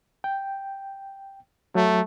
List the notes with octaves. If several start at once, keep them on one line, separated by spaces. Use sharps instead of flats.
G5
F#3 A3